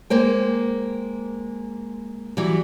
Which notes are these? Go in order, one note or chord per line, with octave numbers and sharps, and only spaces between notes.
G#3 A#3 C5 G5
E3 F#3 G3